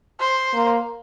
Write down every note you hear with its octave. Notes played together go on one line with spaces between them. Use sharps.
C5
A#3